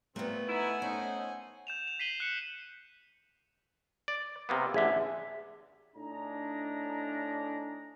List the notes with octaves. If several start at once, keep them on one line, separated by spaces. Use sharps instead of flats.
A#2 A3 B3 C4
D#4 E4 F#5 G#5
A3 C#4 D#4 C5
G6 E7 F7
F7
B6 C7 D#7 F#7 G7
F#6 C#7
D5
C3 A#3 B3
A1 D3 G#4 E5
A2 D4 D#4 G#4 A#5